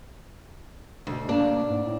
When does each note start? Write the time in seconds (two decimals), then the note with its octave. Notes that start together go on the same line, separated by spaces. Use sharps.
1.07 D2 B2
1.29 A#3 D4
1.69 G#2
1.86 A2